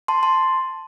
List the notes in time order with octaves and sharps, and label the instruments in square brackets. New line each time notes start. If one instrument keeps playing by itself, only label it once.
[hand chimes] A5 C6
A5 C6